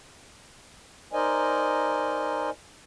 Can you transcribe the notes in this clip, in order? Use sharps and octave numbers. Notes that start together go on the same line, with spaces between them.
D#4 A#4 C5 D5 D#5 G#5